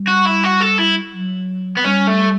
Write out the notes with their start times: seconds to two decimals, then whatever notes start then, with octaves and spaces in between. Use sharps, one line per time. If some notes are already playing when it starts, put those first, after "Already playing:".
Already playing: G3
0.08 F#4
0.26 E4
0.44 F#4
0.61 A4
0.79 E4
1.14 F#3
1.77 B3
1.84 G3 C#4
2.07 A3